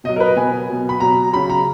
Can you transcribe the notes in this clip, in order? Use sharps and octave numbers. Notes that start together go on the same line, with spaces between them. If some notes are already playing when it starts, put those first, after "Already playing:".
B2 F#3 D#5
A#4
B4
B2 F#3 G#5
B2 F#3
B5
B2 F#3 A#5
C#3 F#3 B5
A#5